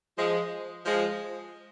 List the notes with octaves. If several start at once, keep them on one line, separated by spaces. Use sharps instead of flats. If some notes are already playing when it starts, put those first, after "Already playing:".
F3 G#3
F3 G#3